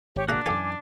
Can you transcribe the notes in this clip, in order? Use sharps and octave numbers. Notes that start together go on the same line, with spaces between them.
G#1 G4 C#5
A#3 D4 F#4 G#4 E5 F5
F#2 E3 G4 A4 F5 G#5 D6